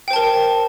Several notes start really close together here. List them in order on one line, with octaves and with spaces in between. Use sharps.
G5 C5 A5 A#4